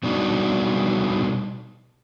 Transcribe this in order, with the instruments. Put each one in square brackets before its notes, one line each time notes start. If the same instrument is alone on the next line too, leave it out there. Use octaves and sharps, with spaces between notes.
[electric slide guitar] B2 G3 B3 D4 D#4 F#4